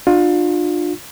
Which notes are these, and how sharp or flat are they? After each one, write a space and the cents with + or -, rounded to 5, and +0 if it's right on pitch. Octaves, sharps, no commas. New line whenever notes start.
D4 +40 F4 +30